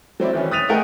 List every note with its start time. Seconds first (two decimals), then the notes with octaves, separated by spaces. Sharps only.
0.20 F#3 C4 E4 D5
0.33 D#3 E3 C#4
0.51 D#6 F#6 A6 B6 D#7 F7
0.69 A3 D#4 G#4 A#4 F#5 G5